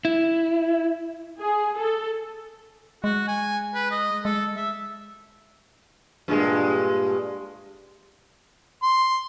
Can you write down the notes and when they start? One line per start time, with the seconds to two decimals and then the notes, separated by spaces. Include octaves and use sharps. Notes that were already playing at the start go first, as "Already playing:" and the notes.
0.05 E4
1.41 G#4
1.77 A4
3.04 G#3 F#4
3.28 G#5
3.74 B4
3.91 D#5
4.25 G#3 A4
4.57 E5
6.28 G2 A#2 G#3
8.83 C6